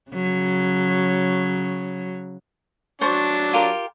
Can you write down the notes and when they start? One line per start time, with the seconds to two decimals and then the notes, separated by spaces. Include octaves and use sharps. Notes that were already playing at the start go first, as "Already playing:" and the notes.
0.12 C#3 F#3
3.01 F#3 D4 C5 A5 C#6
3.53 F4 G4 A#4